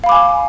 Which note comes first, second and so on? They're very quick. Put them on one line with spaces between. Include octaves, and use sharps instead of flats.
F5 B5 D6 G#5